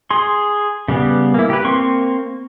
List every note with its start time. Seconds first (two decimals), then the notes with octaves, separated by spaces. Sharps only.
0.11 G#4 C6
0.88 C#3 G3 B3
1.34 A#3 E4
1.50 G4 B4
1.64 A#3 C4 C6 C#6